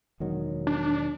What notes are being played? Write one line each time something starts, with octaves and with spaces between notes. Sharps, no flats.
E1 D#3 F#3
D4